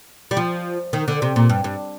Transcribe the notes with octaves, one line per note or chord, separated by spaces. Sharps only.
G3
F3
D#3
D3
C3
A#2
G2
G2